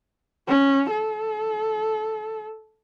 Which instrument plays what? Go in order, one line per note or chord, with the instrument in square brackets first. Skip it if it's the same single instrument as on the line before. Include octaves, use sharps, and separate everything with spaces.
[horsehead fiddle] C#4
A4